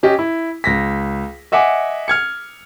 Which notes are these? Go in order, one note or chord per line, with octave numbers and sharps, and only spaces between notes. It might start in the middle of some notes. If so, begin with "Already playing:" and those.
C#4 G4 D#5
E4
C#2 A#6 B6
D#5 E5 F#5 G#5 D6
F6 G#6 C#7